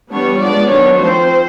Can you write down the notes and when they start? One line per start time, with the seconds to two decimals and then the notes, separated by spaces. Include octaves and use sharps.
0.13 E3 G3 B3 D4 C#5
0.41 F3 G#3 B3 D4 D5
0.70 D#3 F#3 B3 D4 C#5
0.99 F3 A3 C4 C5